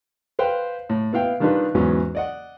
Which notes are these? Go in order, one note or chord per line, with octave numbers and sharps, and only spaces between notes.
B4 C5 F5 G5
A2
B3 E4 F5 G5
D#3 G3 D4 D#4 F4 B4
E2 G#2 E3 F#3 B3 C#4
D5 D#5 F#5